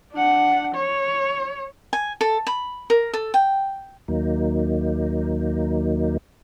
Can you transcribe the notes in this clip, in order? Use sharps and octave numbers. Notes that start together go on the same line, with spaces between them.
D4 F#5
C#5
G#5
A4
B5
A#4
A4
G5
D#2 F#3 A#3 D#4